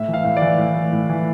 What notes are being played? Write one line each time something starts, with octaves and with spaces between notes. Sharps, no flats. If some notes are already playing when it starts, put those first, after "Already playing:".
Already playing: A2 E5
E3
F5
A2
D5
E3
A2
E3
A2
E3